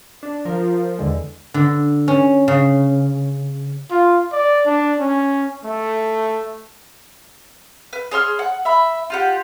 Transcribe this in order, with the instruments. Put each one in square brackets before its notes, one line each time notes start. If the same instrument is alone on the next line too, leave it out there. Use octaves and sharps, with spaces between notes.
[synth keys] D4
[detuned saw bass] F3 [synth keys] A#4
[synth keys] E2 D3 G#3
[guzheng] D3
C#4
C#3
[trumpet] F4
D5
D4
C#4
A3
[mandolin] B4
G#4 C#5 C6 F6
F#5
E5 B5
F4 G4 F#5